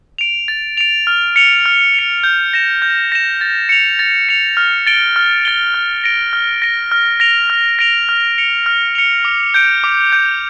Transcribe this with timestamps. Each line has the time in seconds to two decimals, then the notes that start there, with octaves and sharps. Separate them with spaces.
0.18 D7 F7
0.48 A6
0.77 D7 F7
1.07 F6
1.36 C#7 F7
1.66 F6
1.94 C#7 F7
2.24 G6
2.53 A#6 E7
2.82 G6
3.12 A#6 E7
3.41 A6
3.69 C#7 F7
3.99 A6
4.29 C#7 F7
4.57 F6
4.87 A6 D7 G7
5.16 F6
5.45 A6 D7 G7
5.74 F6
6.04 A#6 D7
6.33 F6
6.62 A#6 D7
6.92 F6
7.20 A#6 D7 F7
7.50 F6
7.79 A#6 D7 F7
8.09 F6
8.38 C#7 F7
8.66 F6
8.95 C#7 F7
9.25 D6
9.54 G6 D7
9.84 D6
10.12 G6 D7